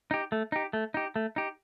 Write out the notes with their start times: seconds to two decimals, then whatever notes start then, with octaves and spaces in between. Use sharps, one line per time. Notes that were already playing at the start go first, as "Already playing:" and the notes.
0.11 D#4 G4
0.32 A3
0.52 D#4 G4
0.73 A3
0.94 D#4 G4
1.16 A3
1.36 D#4 G4